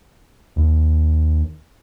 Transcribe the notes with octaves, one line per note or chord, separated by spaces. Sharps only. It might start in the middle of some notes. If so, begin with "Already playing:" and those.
D#2